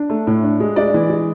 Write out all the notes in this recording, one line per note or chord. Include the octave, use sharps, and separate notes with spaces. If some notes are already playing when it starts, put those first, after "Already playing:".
Already playing: D4
A3
A2
D4
G#3
G#3 D5
E3
G#3